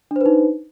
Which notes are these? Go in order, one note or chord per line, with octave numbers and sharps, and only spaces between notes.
D4 D#4 B4 C5